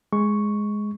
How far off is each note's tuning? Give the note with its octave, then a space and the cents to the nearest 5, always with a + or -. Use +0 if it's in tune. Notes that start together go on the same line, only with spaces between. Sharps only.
G#3 +5 C#6 +0